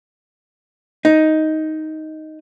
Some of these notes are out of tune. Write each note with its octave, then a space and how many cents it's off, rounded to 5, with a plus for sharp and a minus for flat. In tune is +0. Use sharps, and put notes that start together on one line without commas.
D#4 +5